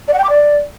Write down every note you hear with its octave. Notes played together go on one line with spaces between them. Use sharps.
D5
F#5
G5
D6
D5